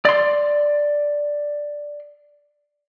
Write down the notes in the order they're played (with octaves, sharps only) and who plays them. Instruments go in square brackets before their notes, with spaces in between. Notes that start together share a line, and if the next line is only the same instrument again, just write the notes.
[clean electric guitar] D5 C6